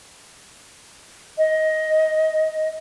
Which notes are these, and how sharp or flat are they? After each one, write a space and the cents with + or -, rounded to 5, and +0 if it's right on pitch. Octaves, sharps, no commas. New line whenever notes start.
D#5 +15